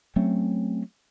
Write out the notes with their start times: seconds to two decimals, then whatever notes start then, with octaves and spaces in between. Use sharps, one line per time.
0.16 F#3 A3 C4 C#4